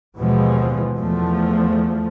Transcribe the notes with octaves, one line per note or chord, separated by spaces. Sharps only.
D#2 B2 E3 F3 G#3
E2 F3 A3